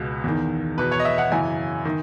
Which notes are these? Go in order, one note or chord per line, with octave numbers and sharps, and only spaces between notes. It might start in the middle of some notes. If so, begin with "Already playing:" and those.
Already playing: C#2 B2
E2 D#3
E2 B2 B4
C#5
D#5
E5
F#5
F#2 C#3 E3 G#5
D#3